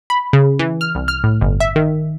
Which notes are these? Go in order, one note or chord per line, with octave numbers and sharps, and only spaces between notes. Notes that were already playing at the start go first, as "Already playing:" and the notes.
B5
C#3
E3
F6
C2
F6
A2
G1
E5
D#3